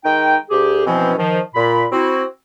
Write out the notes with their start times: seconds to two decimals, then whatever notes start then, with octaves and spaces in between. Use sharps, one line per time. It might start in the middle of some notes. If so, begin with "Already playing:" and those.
0.05 D#3 G#3 D#4 G5
0.50 D2 G4 G#4
0.87 B2 E3 F3 C4 C#4
1.18 D#3 F3
1.55 A#2 B5
1.92 C4 E4 F#4